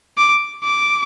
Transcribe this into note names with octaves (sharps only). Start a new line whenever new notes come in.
D6
D6